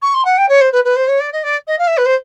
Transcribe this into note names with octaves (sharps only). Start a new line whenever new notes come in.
C#6
C6
F#5
G5
C#5
C5
B4
B4
C5
C#5
D5
D#5
D5
D#5
F5
E5
B4
C5